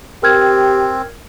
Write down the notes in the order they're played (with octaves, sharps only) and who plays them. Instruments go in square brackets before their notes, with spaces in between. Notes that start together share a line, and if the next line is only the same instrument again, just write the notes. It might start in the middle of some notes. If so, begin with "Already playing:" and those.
[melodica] C4 [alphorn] G4 [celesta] A#4 F6 G#6